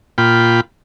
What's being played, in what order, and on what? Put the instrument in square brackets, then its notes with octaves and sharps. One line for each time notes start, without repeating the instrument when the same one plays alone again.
[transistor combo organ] A#2 F4 G5 B5